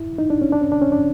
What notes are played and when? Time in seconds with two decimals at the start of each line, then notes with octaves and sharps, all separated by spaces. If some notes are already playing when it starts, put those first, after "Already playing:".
Already playing: E4
0.18 D#4
0.30 D4
0.42 C#4
0.52 D4
0.61 C#4
0.72 D4
0.82 C#4
0.92 D4